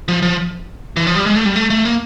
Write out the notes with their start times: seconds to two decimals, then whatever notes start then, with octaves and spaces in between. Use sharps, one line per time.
0.08 F3
0.22 F3
0.97 E3
1.07 F3
1.16 G3
1.26 G#3
1.36 A3
1.46 G3
1.56 A3
1.70 A3
1.85 A#3